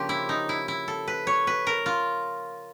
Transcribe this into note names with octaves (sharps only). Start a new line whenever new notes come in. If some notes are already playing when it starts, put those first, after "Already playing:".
Already playing: C#3 F3 A#3 D4 G4 C5
E4
D#4
E4
E4
A4
B4
C#5
B4
A#4
F4